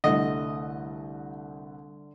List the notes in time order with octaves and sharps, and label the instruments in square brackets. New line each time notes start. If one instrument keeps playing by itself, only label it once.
[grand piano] C2 A3 F#5 [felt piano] D3 [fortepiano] D#5